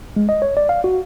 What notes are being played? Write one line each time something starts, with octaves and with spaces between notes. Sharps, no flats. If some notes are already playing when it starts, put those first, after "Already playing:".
G#3
D#5
C#5
D5
F5
F#4